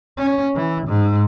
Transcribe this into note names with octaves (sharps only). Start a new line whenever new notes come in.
C#4
E3
G#2